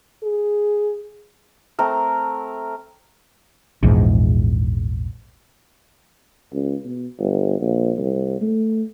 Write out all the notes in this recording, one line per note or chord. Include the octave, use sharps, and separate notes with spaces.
G#4
A3 C4 A#4
A#1 E2 G#2
C#2
B2
G1
A#1
C2
A3